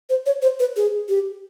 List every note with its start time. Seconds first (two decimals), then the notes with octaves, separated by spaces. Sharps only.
0.10 C5
0.26 C#5
0.42 C5
0.60 B4
0.76 G#4
1.09 G4